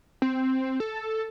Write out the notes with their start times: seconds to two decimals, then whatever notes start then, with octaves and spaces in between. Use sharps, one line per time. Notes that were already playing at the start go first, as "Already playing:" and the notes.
0.22 C4
0.80 A4